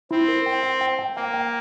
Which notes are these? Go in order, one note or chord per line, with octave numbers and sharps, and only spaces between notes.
C4 E4
A#4
G5
G5
G5
G5
A#3 G5
G5